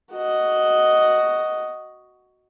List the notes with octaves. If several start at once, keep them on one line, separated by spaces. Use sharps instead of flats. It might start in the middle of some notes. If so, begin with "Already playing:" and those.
F#4 D#5